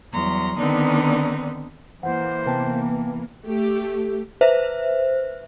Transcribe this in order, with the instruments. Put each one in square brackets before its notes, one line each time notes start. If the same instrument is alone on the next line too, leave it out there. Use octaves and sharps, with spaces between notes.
[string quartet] E2 F#3 G3 A#5 C6
D3 D#3 B3 C4 D4 D#4
[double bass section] E3 A#3 [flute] C5 [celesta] F#5
[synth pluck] C3 B3 [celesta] B4 G5 A5
[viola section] A3 G4
[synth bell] B4 C5 E5